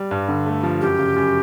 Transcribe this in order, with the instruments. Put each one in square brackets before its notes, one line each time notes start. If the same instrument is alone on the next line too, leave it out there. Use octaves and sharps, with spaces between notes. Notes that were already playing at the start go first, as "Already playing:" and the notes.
Already playing: [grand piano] G3
G2
D3
A3
F3
[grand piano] F#2 [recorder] G4
[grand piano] C#3
F#2